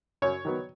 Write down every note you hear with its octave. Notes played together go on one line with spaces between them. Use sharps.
F#2 C#5
D#3 F#3 B3